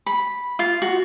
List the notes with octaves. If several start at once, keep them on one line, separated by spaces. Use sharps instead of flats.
B5
F4
F#4